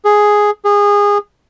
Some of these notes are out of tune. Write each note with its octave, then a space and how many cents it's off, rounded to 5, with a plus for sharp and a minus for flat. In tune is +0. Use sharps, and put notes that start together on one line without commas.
G#4 +0
G#4 -25